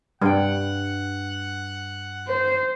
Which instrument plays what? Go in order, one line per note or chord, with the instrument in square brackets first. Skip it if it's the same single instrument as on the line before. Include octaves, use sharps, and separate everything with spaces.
[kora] G2 G5 [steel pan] G3 [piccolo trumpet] F#5
[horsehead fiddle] C5